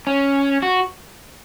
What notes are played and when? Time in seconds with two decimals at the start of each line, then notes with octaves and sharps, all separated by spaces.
0.07 C#4
0.62 F#4